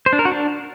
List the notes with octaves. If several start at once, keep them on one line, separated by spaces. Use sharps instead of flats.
C5
D4
A#4
F#4
D4